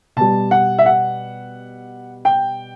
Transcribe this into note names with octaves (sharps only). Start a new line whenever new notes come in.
B2 G3 A5
F#5
E5
F#5
G5